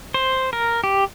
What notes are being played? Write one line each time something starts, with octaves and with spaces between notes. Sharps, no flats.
C5
A#4
G4